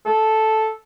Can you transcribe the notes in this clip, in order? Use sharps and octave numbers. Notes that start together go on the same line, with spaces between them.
A4